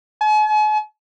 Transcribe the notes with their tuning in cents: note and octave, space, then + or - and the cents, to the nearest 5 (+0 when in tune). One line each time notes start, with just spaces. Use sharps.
G#5 +45